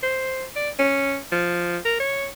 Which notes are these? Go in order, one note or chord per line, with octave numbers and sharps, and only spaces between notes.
C5
D5
C#4
F3
A#4
C#5